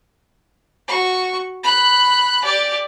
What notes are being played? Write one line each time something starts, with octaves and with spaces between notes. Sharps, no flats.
F#4 C#6
B5 F#6
G4 D5